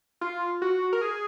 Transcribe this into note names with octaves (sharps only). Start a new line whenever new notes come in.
F4
F#4
A#4
G#4